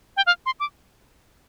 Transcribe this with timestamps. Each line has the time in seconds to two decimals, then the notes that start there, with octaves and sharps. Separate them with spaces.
0.17 G5
0.26 F5
0.46 C6
0.60 D6